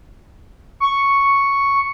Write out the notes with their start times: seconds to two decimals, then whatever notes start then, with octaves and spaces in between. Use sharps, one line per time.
0.80 C#6